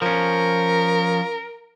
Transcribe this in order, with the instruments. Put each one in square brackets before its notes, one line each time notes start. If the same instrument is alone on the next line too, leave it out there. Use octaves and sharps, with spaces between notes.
[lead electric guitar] F3 C#4 [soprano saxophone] A#4